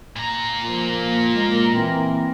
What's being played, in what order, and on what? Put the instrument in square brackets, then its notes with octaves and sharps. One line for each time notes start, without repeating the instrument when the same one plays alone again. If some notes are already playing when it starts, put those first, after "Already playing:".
[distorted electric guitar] A#2 A#5
[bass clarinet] F3 [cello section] A#3 A#4 [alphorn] F4
[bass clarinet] G#3
[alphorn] E3 [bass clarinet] C4